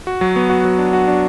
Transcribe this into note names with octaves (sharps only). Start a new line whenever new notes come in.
F#4
F#3
B3
F#4
F#3
D4
F#4
D4